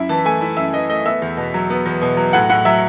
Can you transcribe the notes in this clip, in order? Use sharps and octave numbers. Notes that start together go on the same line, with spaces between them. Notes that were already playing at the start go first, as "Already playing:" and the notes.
Already playing: F#2 E4 E5
E3 A5
A3 G#5
E4
F#2 E5
E3 D#5
A3 D#5
B3 E5
E2
B2
F#3
B3
E2
B2
F#3
A2 F#5
A2 F#5
F#3 E5